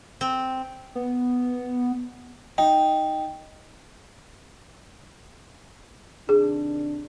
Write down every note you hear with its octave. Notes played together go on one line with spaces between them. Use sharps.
C4
B3
D#4 G5
C3 D#3 D4 G#4